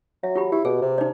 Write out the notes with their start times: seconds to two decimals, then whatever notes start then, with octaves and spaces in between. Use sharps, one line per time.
0.23 F#3 E5
0.35 F4 G4 B5
0.52 E4 G4
0.65 B2 G#4
0.82 C3
0.98 D#4 D5